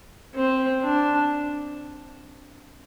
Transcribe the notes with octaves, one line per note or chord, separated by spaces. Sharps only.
C4
D4